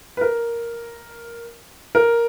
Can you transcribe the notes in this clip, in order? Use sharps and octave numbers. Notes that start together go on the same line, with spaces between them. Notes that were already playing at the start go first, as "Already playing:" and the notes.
B4
A#4
A#4